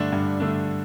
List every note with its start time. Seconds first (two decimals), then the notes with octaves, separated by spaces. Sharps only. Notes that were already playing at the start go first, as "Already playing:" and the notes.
Already playing: G2 D3 A3 D4
0.13 G2
0.40 D3 A3 D4